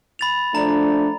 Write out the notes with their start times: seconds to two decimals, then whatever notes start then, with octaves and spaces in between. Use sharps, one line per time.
0.19 B5 A6 F7
0.55 F3 A3 D4 A#5